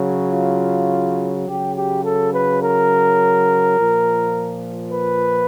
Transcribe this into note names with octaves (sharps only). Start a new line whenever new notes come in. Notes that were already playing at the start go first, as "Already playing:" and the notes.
Already playing: C#3 F#3
F4
C#3 F#3 G4
G4
A4
B4
A#4
A#2 F3
B4